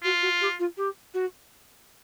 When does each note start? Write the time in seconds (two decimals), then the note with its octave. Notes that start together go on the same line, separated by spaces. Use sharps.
0.03 F4 F#4
0.22 F#4
0.40 G4
0.59 F4
0.77 G4
1.13 F#4